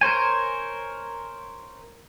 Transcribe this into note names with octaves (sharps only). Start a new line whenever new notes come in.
A#4 C5 C#5 G#5